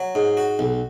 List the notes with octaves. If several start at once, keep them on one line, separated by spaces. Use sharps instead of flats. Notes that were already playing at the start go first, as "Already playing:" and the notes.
Already playing: F#3
G#2
F#4
B1